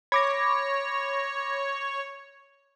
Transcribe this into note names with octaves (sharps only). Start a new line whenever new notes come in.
C#5 B5 D6 A#6